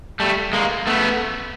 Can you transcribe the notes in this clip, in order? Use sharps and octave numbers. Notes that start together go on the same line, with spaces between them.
G3 A3
G#3 A#3
A3 B3